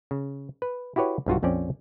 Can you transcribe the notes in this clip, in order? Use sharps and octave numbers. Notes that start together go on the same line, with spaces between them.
C#3
B4
E4 F#4 G4 B4 C#5
B1 G2 F4 F#4
A#1 F2 C4 C#4 D5